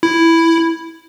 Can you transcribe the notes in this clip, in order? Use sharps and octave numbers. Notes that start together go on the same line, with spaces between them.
E4